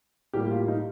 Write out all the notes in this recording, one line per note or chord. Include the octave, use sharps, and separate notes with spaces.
A2 G3 A#3 G4
F4
D#4